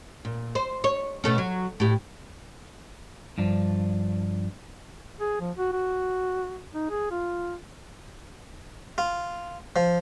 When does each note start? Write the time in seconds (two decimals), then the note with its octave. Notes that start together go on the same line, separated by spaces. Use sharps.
0.25 A#2
0.55 C5
0.84 C#5
1.24 B2 A3 C#4
1.38 F#3
1.80 A2 G4
3.38 G2 F3 D4
5.21 G#4
5.40 F3
5.58 F#4
5.73 F#4
6.74 D#4
6.90 G#4
7.11 F4
8.98 F4
9.76 F3